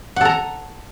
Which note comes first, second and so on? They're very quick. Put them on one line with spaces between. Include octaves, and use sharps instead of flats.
F#5 A4 A#5